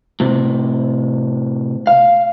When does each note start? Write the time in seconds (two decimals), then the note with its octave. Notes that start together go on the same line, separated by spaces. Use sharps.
0.20 A2 C3
1.87 F5